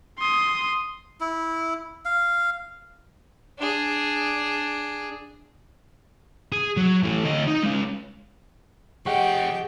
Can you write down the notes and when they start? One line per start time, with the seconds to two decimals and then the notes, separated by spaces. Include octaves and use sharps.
0.19 C6 D#6
1.21 E4
2.05 F5
3.58 D4 G#4
6.52 G#4
6.77 F#3
7.03 E3 A3
7.25 D2 D#5
7.48 D#4
7.63 G#3 C#4
9.06 F3 G4 G#4 D#5 F#5 G5 C#6